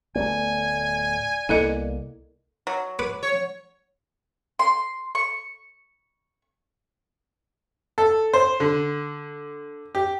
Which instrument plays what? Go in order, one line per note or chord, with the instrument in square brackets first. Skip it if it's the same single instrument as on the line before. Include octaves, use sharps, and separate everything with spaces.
[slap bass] D1 A3 B3 [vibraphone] D5 [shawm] G#5
[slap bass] C2 A#3 B3 [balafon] E4 A4 D#5
[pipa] F#3
[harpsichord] B4 D6
[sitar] C#5
[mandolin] C6
C#6
[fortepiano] A4
C5
D3
G4